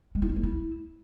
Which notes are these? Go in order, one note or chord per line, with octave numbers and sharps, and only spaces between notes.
G#3
E4
C#4
A#3
E4